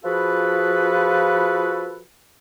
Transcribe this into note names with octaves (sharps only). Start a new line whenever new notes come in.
F3 F4 F#4 G#4 A4 B4